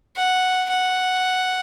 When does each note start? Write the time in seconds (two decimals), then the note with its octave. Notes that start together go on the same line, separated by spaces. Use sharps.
0.17 F#5
0.70 F#5